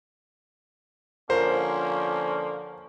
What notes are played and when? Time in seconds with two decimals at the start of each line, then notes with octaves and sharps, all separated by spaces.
1.30 D3 F3 A#3 C#4 A#4 C5